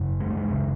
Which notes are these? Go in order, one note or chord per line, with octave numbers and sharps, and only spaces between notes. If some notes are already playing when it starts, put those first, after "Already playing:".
Already playing: F#2 C#3
G#3
A3
G#3
F#2 C#3